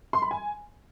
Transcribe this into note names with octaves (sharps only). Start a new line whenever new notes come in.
C6
B5
G#5